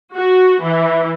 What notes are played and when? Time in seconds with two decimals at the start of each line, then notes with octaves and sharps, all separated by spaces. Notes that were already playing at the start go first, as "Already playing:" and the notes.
0.14 F#4
0.61 E3